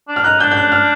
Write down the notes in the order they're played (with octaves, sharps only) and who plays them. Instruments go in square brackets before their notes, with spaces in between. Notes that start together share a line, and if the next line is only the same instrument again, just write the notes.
[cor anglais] D4
[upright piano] F6
[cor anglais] D#4 [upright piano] F#6
[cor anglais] D4 [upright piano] G6
[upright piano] G6
F#6
F6